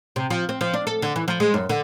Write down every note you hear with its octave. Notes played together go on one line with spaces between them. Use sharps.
C3
F3
C4
F3
D4
A4
D3
E3
F3
G#3
F#2
D3